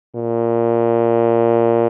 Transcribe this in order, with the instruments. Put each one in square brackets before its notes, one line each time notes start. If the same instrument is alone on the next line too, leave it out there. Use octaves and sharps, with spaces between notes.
[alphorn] A#2